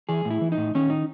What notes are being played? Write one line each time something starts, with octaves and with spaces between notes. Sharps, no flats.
E3 G#4
A2
E4
E3
D#4
A2
D#3 C#4
D#4